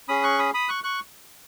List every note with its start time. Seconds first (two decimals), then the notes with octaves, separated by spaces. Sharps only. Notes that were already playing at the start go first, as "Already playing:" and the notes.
0.08 C#4 G#4 B5 D#6
0.23 C#6 F#6
0.39 B5 D#6
0.54 B5 D#6
0.69 C#6 F#6
0.84 C#6 F#6